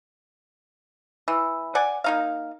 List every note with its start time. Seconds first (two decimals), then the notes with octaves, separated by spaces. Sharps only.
1.28 E3
1.75 D5 F#5 G#5
2.04 A#3 D#4 F5